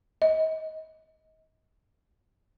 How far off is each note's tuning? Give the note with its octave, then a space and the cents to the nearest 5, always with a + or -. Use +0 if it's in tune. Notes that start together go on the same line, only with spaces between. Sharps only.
D#5 +30